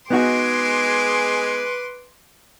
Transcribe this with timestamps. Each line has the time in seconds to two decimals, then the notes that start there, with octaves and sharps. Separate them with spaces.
0.10 G#3 B3 D#4 F#4 G#4 B4 C6 D6